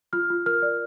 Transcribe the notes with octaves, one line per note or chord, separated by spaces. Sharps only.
F4 F6
F4
A#4 F6
D5